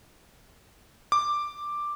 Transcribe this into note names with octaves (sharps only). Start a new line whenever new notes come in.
D6